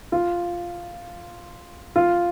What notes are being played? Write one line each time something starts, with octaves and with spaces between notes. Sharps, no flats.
F4
F4